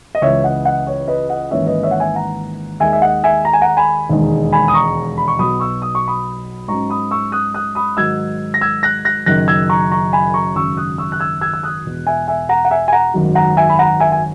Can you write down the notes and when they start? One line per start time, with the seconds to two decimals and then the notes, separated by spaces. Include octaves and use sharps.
0.15 D#5
0.22 C#2 C#3 E3 C#5 E5
0.44 D#5 F#5
0.65 D#5 F#5
0.87 C#5
1.08 B4 D#5
1.29 D#5 F#5
1.51 G#1 G#2 E3 A#3 C#4 C#5 E5
1.67 B4 D#5
1.83 C#5 E5
1.91 F#5
2.00 E5 G#5
2.16 F#5 A#5
2.80 D#2 D#3 G#3 E5 G#5
2.93 E5
3.02 D#5 F#5
3.24 E5 G#5
3.45 A#5
3.53 G#5
3.61 F#5 A#5
3.77 G#5 B5
4.10 E1 D#2 D#3 G#3 D#4
4.52 G#5 B5
4.68 D#6
4.74 A#5 C#6
5.18 B5
5.28 C#6
5.38 B1 B2 F#3 B5 D#6
5.60 C#6 E6
5.82 D#6
5.95 C#6
6.08 B5 D#6
6.68 G#2 F#3 C#4 A#5 C#6
6.90 B5 D#6
7.11 C#6 E6
7.32 D#6 F#6
7.54 D#6 F#6
7.75 B5 D#6
7.97 G#2 D#3 F#3 E6 G#6
8.54 A#6
8.61 E6 G#6
8.83 F#6 A#6
9.05 F#6 A#6
9.26 F#1 F#2 D#3 F#3 F#6 A#6
9.48 E6 G#6
9.69 A#5 C#6
9.92 A#5 C#6
10.13 G#5 B5
10.34 A#5 C#6
10.56 G#1 F#2 C#3 C#6 E6
10.77 D#6 F#6
10.98 C#6 E6
11.12 F#6
11.20 E6 G#6
11.41 E6 G#6
11.53 E6
11.63 D#6 F#6
11.86 E1 E2 B2
12.07 E5 G#5
12.28 E5 G#5
12.49 F#5 A#5
12.65 F#5
12.71 E5 G#5
12.88 G#5
12.93 F#5 A#5
13.14 G#1 F#2 D#3 F#3
13.35 F#5 A#5
13.57 E5 G#5
13.69 B5
13.79 F#5 A#5
14.00 E5 G#5
14.12 G#5